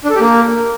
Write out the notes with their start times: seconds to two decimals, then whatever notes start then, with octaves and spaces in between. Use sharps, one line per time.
0.05 D4
0.10 A4
0.15 G4
0.20 A#3